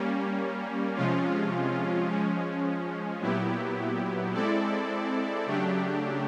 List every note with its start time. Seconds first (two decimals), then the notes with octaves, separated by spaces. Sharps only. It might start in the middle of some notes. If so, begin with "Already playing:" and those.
Already playing: G3 A#3 C#4
0.96 C3 F3 G#3 C#4 F4
2.09 F3 G#3 C#4
3.21 A#2 F#3 B3 E4 G4
4.33 G#3 C4 E4 A4 D5
5.46 C#3 F#3 A3 D4 G4